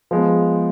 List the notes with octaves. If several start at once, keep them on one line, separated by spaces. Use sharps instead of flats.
F3 G#3 B3